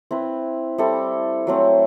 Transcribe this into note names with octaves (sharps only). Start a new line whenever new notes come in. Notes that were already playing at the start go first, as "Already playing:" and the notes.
C4 E4 B4
G3 C4 E4 A4
F#3 A3 C4